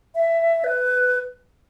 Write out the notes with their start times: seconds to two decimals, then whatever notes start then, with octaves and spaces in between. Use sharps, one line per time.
0.15 E5
0.64 B4